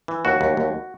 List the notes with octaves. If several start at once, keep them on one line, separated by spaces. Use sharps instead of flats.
E3
D#2 F#4
D#2
D#2